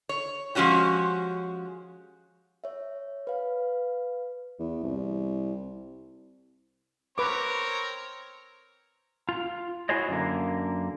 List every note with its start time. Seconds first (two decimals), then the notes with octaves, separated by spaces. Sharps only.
0.09 C#5
0.55 F3 G#3 C#4 F#4 G4
2.64 C#5 E5
3.27 B4 F5
4.59 E2
4.83 C2
7.18 C4 A#4 B4 C#5 D6
9.29 F4
9.89 E4 F#4 G#4 C5 C#5 D#5
10.09 F#2 D3 A#3